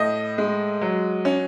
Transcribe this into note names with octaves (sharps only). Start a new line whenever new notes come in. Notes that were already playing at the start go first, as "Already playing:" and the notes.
Already playing: A2 D#5
G#3
F#3
C#4